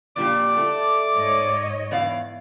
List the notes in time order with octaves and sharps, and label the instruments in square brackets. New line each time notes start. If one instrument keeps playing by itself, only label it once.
[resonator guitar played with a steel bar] F2 A#2 G4 [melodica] D5 [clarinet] D6
[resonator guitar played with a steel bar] A3 A4
[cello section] G#2 C#5 D#5
[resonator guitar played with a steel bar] E2 D5 F5